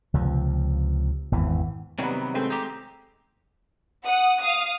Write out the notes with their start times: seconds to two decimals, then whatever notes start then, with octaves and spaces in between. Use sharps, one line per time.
0.14 C#2 C3 F3
1.32 G#1 E2 E3
1.99 C3 D#3 F#3 G3 B3
2.34 G#3 A3 C4
2.50 D#4 G4
4.05 F#5 D#6
4.41 F5 D#6